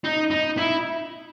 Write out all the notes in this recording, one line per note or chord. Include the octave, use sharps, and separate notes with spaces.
D#4
D#4
E4